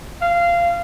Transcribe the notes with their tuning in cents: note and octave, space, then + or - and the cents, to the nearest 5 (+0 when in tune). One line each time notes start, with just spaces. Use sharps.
F5 -20